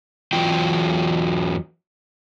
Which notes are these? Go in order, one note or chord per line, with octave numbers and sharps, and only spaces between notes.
E2 E3 F#3 F4 G5